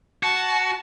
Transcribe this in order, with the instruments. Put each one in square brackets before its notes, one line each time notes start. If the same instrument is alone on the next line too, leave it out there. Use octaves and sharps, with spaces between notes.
[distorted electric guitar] F#4 [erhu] A5